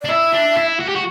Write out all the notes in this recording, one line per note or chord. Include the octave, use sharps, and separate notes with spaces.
D5
D4
E4 E5
D4
E4
F#4
G4
F#4